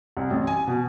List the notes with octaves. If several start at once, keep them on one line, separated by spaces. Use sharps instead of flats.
C2
A1
G#5
B2